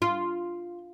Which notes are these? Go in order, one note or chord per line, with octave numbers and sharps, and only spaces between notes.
F4